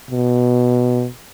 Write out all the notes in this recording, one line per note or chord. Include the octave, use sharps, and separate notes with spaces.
B2